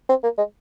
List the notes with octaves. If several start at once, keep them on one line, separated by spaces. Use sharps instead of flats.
C4
A#3
G#3